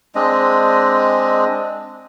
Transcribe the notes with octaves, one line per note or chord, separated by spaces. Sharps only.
G#3 C4 D4 D#5